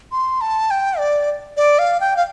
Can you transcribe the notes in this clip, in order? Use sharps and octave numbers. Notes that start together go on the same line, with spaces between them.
C6
A5
G5
D5
D5
F5
G5
F5